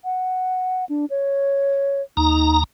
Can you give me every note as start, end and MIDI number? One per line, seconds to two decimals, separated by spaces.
0.04 0.85 78
0.89 1.06 62
1.10 2.02 73
2.17 2.64 39
2.17 2.56 63
2.17 2.64 82